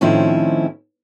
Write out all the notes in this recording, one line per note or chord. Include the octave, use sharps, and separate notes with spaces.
A2 D#3 F3 C4 C#4 E4